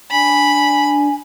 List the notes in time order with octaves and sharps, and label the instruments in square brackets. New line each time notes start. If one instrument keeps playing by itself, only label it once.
[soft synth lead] D4 [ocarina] G#5 [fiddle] B5